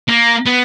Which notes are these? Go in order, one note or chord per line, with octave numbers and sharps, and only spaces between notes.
A#3
B3